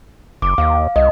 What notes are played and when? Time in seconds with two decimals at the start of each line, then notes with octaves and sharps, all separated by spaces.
0.42 F#1 D6
0.58 D#2 F5
0.96 C2 D#5